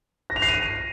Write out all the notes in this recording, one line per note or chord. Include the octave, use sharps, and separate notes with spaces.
A#6
F7
C7
D#7